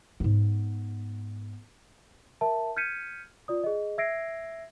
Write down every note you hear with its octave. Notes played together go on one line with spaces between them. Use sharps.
G#2 B3
A#4 E5 A5
F6 G6 G#6 B6 C#7 D#7
F4 D5 D#6
G#4 D#5
E5 E6 G#6 A#6 C7 D7